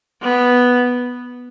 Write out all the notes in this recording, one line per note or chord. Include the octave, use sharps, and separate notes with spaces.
B3